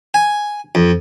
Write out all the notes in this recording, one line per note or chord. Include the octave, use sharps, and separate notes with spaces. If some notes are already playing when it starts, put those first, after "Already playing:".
G#5
F2